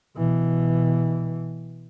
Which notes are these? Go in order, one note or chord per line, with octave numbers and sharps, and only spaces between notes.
B2 E3